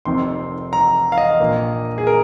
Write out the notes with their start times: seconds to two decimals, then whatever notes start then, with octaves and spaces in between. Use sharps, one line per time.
0.05 F1 F2 C3 D#3 C4 C6
0.73 A#5
1.12 F5
1.18 D#5
1.40 A#1 A#2 A#3
1.98 G#4
2.07 A#4